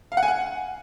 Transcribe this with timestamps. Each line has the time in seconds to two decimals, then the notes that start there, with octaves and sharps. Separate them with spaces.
0.12 F5
0.17 F#5
0.23 G#5
0.28 F#5